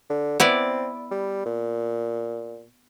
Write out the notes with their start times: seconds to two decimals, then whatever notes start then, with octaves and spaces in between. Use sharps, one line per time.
0.10 D3
0.40 B3 C4 E4 D5
1.11 G3
1.46 A#2